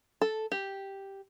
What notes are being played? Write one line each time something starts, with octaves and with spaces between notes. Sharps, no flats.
A4
G4